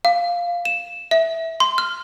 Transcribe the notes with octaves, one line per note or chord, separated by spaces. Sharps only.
F5
E7
E5
C6
F6